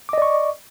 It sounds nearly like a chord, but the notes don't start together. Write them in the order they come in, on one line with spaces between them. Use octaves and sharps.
D6 D#5 D5 C#6